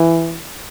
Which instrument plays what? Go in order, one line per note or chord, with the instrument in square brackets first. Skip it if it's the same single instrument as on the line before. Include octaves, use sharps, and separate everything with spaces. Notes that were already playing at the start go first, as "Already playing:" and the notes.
Already playing: [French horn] E3